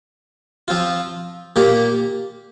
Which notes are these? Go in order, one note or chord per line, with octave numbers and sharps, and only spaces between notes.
F3 C4 F4
A#2 A#3 G4